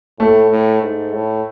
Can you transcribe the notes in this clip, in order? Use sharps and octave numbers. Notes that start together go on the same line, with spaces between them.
A2 A3
A2
G#2
A2